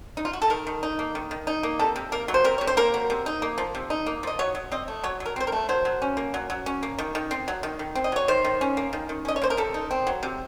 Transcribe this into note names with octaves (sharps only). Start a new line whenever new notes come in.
D#4
F4
F#4
A4
D#3 A#4
D#3
D#4
A#3
D#3
D#3
D#4
A#3
C3 A4
C3
A#3 A#4
F#3
C5
C3 A#4
C3 C#5
C5
A#3 A#4
F#3
C3
D#4
A#3
F3
C3
D#4
A#3
F3 D#5
F#3 C#5
F#3
C4 D#5
A3
F#3 C#5
F#3
A#4
C4 C5
A#4
A3
F#3 C5
F#3
C#4
A#3
F#3
F#3
C#4
A#3
D#3
D#3
C4
F#3
D#3
D#3
C4
D#5
F#3 C#5
D#3 C5
D#3
C#4
A#3
D#3
D#3
C#4 D#5
C#5
A#3 C5
A#4
C3 A4
D#4
C4
F#3
C3